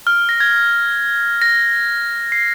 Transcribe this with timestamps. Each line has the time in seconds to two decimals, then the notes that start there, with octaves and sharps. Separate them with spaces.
0.07 F6
0.29 A#6
0.40 G#6
1.42 A#6
2.32 C7